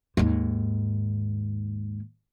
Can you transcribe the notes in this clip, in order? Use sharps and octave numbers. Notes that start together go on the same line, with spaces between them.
D#2 G#2